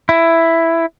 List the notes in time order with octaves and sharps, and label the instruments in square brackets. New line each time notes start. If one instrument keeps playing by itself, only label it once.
[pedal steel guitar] E4